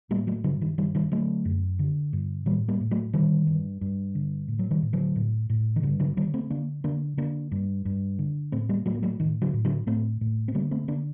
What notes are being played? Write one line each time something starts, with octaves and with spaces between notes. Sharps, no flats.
A2 G3 A#3
F#3 A3
G2 D3 F#3
D#3 G3
G2 D#3 G3
D#3 G3
D3 F#3 A3
F#2
D3
G2
A2 D#3 G3
G3 A#3
A2
F#3 A3
D3 D#3 G3
G2
G2
D3
A2
F#3
D#3 G3
A2
D3 F#3
A2
A2
D#3
G2 D3
D3 F#3
D3 D#3 G3
A3 C4
D3 A#3 D4
D3 A#3 D4
D3 A#3 D4
G2
G2
D3
A2 A3 C4
G3 A#3
A2 F#3 A3
A#3
F#3 A3
A2 D#3
D3 F#3
A2
D3 F#3
A2 A3 C4
A2
C4
D3 G3 A#3
A3 C4
D3 A#3 D4